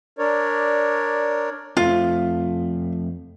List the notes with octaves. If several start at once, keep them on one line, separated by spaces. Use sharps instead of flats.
D4 A#4 C#5 D5
F2 F3 A3 F4